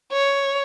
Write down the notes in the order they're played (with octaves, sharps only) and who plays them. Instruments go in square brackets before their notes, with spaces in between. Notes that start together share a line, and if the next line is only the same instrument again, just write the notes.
[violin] C#5